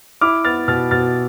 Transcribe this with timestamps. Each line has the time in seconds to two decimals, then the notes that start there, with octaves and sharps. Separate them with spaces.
0.21 E4 D6 F6
0.44 B3 F6 A6
0.68 B2 F6 A6
0.91 B2 F6 A6